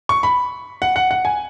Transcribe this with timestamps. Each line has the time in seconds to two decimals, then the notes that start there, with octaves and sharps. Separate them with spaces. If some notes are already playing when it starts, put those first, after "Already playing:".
0.09 C#6
0.23 B5
0.82 F#5
0.96 F#5
1.11 F#5
1.25 G#5